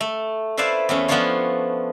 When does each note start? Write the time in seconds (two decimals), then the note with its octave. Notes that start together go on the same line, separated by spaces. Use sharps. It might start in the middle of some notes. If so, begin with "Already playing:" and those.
0.01 A3
0.57 E4 B4 C5 D5 E5 F5
0.89 E2 A3 C#4
1.08 F3 B3 C#4 D4 F4 C#5